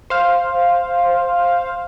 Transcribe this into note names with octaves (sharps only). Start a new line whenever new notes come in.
C5 F5